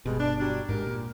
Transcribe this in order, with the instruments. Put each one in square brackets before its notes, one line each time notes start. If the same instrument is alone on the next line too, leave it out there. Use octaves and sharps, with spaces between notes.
[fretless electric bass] G1 B2 [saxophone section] G3 G#3
[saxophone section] D4
F#3 G3 D4
[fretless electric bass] A1 G#2 [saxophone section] G4 A#4
[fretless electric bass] A#2